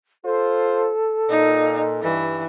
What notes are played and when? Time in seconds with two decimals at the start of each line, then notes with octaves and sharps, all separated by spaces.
0.25 F4 A4 C5
1.30 A#2 D#4
2.02 G2 E3